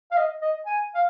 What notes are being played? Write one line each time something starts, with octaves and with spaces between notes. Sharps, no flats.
F5
D#5
D#5
G#5
F5